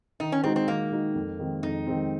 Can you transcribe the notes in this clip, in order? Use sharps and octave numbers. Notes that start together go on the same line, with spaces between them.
D#3 D#4
C#4
G#3 C4 D#4 F#4
C4
D#3 A#3
G#3 D#4 F#4
F2
D#3 G#3 C4
F2 D#4
D#3 G#3 C4